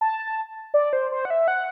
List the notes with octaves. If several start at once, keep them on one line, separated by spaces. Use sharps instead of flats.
A5
D5
C5
C5
F#5
E5
F#5